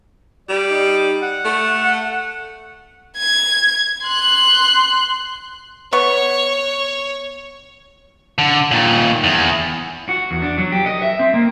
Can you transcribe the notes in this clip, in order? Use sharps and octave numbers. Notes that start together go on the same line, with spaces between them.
G3 D5
D#4
F#5
A3
G#6
C6 F#6
B3 C#5 C#6
D3
A#2 D#3
E2
F#4
E2
D4
F#3
G4
D#5
E5
C4
A#3